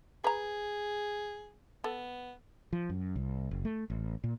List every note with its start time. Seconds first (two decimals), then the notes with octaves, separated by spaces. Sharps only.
0.24 G#4 B4 A#5
1.84 B3 A4
2.73 F3
2.90 F#2
3.16 C2
3.51 F#1
3.65 A3
3.90 A1
4.24 A#2